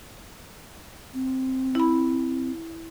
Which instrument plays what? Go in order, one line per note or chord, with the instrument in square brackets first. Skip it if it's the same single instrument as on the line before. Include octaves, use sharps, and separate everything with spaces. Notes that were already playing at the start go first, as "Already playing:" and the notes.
[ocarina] C4
[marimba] E4 B5